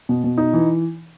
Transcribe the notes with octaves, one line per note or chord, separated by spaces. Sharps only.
B2
B2
D#4
E3